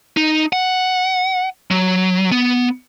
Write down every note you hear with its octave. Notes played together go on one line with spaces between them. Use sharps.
D#4
F#5
F#3
B3